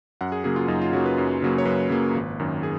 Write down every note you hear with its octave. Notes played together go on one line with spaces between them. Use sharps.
F#2 F#5
G#4
C#3 F#3 A#3 G#4
F4
F#2 D#4
F4
C#3 F#3 A#3 F#4
B4
F#2
C#3 F#3 A#3
C#5
F#2 B4
C#3 F#3 A#3
G#1
F#2 D#3
G#4